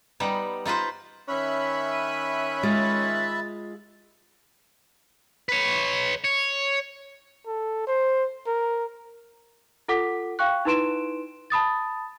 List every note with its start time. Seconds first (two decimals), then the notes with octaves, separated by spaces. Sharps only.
0.20 G3 B3 D#4
0.66 D#4 F4 B4 C5
1.29 D#3 C#4 E5 B5 F#6
1.92 D#7
2.63 G#3 F4 A6
5.49 B4 C#5
6.25 C#5
7.47 A4
7.87 C5
8.47 A#4
9.88 F4 A4 F#5 D6 B6
10.39 F5 G5 C#6 F#6
10.65 D#4 E4 B4 C6 D7 E7
11.50 A5 B5 D#6 A6